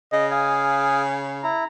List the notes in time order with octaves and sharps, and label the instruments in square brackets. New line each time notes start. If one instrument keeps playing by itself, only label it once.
[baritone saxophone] C#3 [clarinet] D#5
[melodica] F5 D#6 [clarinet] G#5
[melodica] E4 [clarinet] A#5